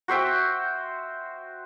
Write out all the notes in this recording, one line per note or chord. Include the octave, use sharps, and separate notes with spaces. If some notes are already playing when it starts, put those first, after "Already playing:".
F#4 C5 E5 G5